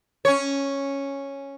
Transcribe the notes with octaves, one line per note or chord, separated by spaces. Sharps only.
C#4 C#5